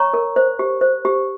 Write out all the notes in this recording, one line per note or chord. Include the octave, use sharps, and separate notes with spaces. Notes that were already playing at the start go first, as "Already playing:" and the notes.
Already playing: C#5 A#5 C#6
A#4
C5
G4
C5
G4